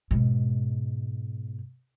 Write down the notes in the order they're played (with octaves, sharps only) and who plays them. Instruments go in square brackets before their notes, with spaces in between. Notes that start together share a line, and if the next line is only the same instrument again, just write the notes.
[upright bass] G#2 B2